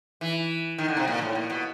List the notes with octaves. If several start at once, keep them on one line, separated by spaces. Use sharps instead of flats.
E3
D#3
D3
C3
A#2
A2
A#2
B2